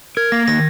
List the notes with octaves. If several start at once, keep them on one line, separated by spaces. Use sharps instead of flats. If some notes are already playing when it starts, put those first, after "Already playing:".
A#4 G#6
A#3 A#6
D#3 A#6